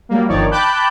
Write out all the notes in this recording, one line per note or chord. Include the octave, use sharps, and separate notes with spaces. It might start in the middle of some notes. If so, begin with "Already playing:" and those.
F#3 G3 A#3
G1 D#3 F3 D#4 C#5 D5
G5 A5 B5 D6 F#6 G6